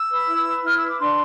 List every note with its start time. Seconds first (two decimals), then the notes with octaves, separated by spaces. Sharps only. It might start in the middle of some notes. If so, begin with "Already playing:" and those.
Already playing: E6
0.09 B4
0.27 E4
0.45 B4
0.64 E4 F6
0.75 E6
0.82 B4
0.87 D6
0.99 D4 C6